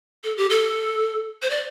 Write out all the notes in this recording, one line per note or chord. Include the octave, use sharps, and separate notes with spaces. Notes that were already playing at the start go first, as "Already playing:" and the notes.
A4
G4
A4
C5
D5